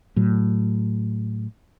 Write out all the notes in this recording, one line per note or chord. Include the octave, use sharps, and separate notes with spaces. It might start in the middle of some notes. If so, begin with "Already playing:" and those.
A2 F#3